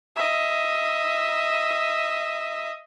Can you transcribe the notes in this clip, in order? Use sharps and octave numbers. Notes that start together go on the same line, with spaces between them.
D#5 E5